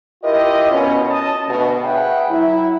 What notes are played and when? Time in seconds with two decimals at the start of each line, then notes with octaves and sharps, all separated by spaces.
0.23 E4 F4 G4 A#4 D#5
0.71 B2 C#4
1.10 D#5 A5
1.47 D2 B2
1.82 G#4 B4 C#5 E5 F#5 G5
2.30 F#3 E4